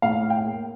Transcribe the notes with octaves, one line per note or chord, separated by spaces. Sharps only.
A2 F5
G5
A#3